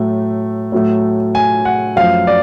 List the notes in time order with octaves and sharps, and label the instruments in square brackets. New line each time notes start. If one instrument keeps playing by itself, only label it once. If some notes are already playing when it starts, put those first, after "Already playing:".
Already playing: [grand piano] A2 F#3 A3
A2 F#3 A3
G#5
F#5
F#2 F3 A3 F5
D5